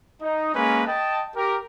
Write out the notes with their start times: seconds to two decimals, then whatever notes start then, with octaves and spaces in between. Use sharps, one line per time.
0.22 D#4
0.54 G#3 A#3 C#4 B4
0.86 D#5 G5 A5
1.36 G4 A#4